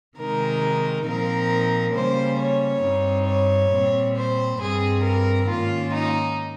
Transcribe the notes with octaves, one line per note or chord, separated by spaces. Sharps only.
C3 D#3 G#3 D#4 A#4
A#2 F3 C4 D#4 A#4
C#3 G3 A#3 C#4 C5
C#5
G2 G3 C4 D#4
C#5
A#2 G3 C4
C5
G2 G3 C4 G#4
A#4
G#2 D#3 A#3 C#4 F4
D#4